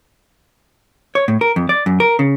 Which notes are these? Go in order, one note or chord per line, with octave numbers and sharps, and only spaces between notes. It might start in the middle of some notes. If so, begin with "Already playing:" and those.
C#5
A2
A#4
F2
D5
F#2
A#4
C#3